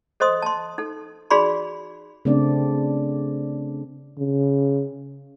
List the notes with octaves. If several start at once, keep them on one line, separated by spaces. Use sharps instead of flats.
A4 C5 D#5 C6 D#6
A5 C6
D#4 A4
D#4 F#4 G#4 D5 B5 C6
C#3 A3 C4 D4 D5
C#3